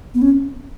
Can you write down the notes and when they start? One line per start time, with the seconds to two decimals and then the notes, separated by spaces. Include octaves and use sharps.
0.14 B3
0.22 C#4